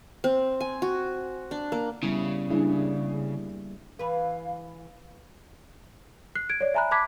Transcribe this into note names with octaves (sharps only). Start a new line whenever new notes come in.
C4
G#5
F#4
D4
A#3
C#3 G3 B3 E4
G3 A#3 D4 E4 G#4
E3 B4 F5
F#6 C7
G#6 D7
C#5 D5
E5 G#5 A#5 B5 F#6
A5 B5 D6 F#6 G#6 B6